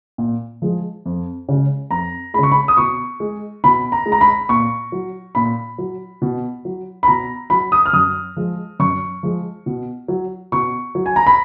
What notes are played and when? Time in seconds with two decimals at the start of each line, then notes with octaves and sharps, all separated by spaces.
0.18 A#2
0.62 F3 G#3
1.06 F2
1.49 C#3 G#3
1.90 F2 A#5
2.34 G#3 B5
2.38 C#3 C#6
2.52 B5
2.68 D#6
2.77 B2 C#6
3.20 G#3
3.64 B2 B5
3.92 A#5
4.06 G#3
4.12 A#5
4.21 B5
4.49 A#2 C#6
4.92 F#3
5.35 A#2 B5
5.78 F#3
6.22 B2
6.65 F#3
7.03 B5
7.08 B2 A#5
7.50 F#3 B5
7.72 D#6
7.86 F6
7.93 F#2 D#6
8.37 F3 G#3
8.80 F#2 C#6
9.23 F3 G#3
9.66 B2
10.08 F#3
10.52 B2 C#6
10.95 F#3
11.06 G#5
11.16 A#5
11.27 B5